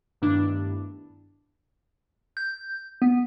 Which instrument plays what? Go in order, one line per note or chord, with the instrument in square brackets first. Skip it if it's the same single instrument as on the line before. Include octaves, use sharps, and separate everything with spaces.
[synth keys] G2 D#3 A3 B3 D4 E4
[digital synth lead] G6
B3